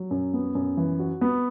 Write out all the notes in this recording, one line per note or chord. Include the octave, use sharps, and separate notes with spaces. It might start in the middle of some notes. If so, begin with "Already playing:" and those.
Already playing: F#3
F#2
B3
F#2
E3
F#4
B3